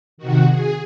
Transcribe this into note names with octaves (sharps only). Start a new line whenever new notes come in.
C3 D#3 F#4
G#4